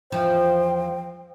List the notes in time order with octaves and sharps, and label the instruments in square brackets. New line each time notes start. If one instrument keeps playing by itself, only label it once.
[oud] E2 F3 [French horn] C5 [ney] G5